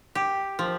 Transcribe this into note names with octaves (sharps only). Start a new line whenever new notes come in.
G4
F3